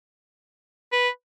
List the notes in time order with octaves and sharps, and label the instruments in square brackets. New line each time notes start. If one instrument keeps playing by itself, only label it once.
[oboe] B4